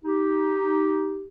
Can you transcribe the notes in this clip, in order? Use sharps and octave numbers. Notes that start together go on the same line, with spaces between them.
D#4 G4